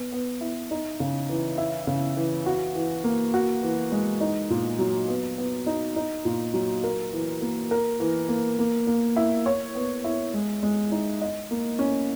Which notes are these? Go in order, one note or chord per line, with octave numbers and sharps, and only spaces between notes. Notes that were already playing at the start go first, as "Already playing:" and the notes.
Already playing: B3
B3
E4
D#4
C#3
E3
E4
C#3
E3
F#4
E3
A#3
F#4
E3
G#3
D#4
A#2
F#3
B3
B3
D#4
D#4
A#2
F#3
A#4
E3
A#3
A#4
E3
A#3
A#3
A#3
E4
C#5
B3
E4
G#3
G#3
D#4
D#5
A#3
C#4